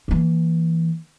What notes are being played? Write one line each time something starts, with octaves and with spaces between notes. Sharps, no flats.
E3 A#3